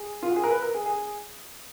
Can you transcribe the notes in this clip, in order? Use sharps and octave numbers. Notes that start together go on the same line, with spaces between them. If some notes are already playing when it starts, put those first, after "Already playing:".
Already playing: G#4
F4
F#4
G#4
A#4
B4
A#4
G#4
G#4